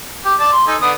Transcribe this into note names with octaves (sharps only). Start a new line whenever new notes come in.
G4
D5 A5
C6
D#4 A4 G#5
D3 B3 D#6